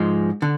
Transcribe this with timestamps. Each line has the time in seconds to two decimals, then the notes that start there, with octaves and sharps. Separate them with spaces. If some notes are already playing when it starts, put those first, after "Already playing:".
Already playing: G#2 F3 G#3
0.42 D3